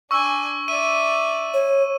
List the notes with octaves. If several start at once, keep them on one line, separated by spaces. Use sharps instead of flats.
D4 G#5 C#6 E6
D5 E5 D#7
C#5